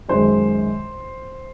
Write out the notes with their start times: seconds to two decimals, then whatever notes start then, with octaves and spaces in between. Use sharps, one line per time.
0.09 F#2 D#3 G#3 C5